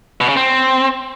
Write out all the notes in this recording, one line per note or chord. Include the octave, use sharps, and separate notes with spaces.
B2
C#3
C4